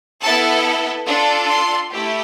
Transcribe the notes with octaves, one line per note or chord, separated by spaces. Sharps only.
B3 E4 A4 A5
D4 F4 A4
C6
A3 E4 G4